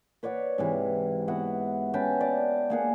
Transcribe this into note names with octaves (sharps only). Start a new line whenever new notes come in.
B4 C#5 D5 F#5
G#2 C3 E3
B3 E4 F#4 F#5
C#4 B4 G5 A5
D5
A#3 G#4 F#5